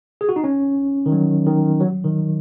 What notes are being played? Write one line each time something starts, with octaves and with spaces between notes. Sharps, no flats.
G#4
F#4
D#4
C#4
D#3
F#3
D#3
F#3
D#3